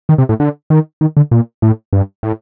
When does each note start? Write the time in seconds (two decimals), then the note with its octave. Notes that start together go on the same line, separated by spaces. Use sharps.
0.09 D#3
0.18 C3
0.29 A2
0.40 D3
0.70 D#3
1.01 D#3
1.17 D3
1.31 A#2
1.62 A2
1.93 G2
2.23 A2